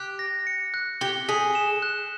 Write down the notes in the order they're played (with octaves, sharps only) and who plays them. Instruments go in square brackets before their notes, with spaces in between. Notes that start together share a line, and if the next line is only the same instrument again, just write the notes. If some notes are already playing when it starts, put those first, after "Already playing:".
Already playing: [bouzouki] G4 [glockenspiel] F#6
[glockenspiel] A#6
C#7
F#6
[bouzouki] G4 [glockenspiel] G7
[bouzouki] G#4 [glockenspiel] B6
[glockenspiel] E7
F#6